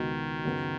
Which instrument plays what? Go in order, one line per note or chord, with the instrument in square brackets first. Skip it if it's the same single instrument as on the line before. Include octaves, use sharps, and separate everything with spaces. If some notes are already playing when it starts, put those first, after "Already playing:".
Already playing: [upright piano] C#2 B2 B3 F#4 D#5 [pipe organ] D#3
[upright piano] F#2 C#3 B3